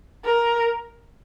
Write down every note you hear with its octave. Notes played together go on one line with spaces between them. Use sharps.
A#4